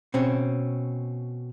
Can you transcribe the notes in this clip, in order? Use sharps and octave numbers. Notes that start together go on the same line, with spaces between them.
B2 C4 C#4